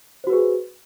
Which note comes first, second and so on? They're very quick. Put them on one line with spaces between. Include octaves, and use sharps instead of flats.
C5 F#4 B4 G#4